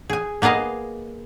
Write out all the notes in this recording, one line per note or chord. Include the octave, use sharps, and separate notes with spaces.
G#4 G#5
A#3 B3 G#4 D#5 F5